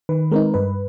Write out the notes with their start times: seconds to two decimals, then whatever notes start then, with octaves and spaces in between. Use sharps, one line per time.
0.09 D#3 B4
0.31 G#3 C4 D#4 A#4
0.54 G2 B4